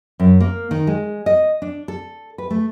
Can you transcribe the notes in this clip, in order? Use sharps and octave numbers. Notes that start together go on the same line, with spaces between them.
F#2
A#3
D#3
G#3
D#5
D4
A4
B4
A3